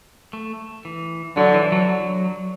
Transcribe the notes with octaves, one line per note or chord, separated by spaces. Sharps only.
A3
E3
D3 F#3
E3
F#3
F#3